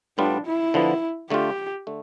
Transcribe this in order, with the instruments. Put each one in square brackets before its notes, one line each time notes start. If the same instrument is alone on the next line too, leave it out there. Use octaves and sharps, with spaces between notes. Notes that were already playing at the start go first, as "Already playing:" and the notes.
[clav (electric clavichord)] A2 G3 B3 F4 [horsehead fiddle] D4
[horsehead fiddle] E4
[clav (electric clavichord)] D3 F3 B3
[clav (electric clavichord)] D3 A3 D4 F4 [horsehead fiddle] G4
[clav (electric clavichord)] D3 A3